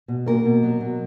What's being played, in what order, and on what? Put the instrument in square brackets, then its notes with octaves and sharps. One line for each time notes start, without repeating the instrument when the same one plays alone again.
[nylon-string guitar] B2
A#3 A#4
B2
F#3
B2